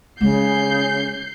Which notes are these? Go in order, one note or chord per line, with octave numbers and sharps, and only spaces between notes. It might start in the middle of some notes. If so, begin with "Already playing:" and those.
C#3 G#3 G6 C7